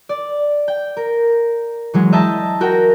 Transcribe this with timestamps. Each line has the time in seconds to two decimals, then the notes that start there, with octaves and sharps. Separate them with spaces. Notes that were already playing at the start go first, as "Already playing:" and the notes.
0.09 D5
0.68 G5
0.97 A#4
1.94 E3 F#3 G#3
2.12 D#5 E5 G5 A5 A#5
2.61 F#4 A#4 G5